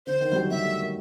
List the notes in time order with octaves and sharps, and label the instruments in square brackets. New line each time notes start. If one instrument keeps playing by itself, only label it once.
[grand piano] D3 [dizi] C5
[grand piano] D#3
G3
F#3
[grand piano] G3 [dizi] E5
[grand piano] A3
A#3